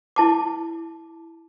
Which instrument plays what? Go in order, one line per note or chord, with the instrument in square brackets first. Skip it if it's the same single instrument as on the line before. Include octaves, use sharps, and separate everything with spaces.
[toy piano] E4 A5 D6